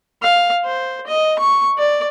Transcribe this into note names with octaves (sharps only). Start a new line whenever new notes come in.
F5
C5
D#5
C#6
D5